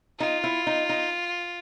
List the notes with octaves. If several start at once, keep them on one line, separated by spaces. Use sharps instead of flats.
D#4 F4
E4
D#4
D#4